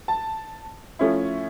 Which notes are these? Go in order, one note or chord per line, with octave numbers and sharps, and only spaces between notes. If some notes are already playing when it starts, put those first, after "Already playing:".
A5
F3 A3 C#4 E4